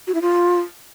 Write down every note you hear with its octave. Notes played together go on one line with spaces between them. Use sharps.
F#4
E4
F4